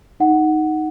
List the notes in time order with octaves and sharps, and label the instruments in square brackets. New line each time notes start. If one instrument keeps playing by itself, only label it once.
[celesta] D#4 F#5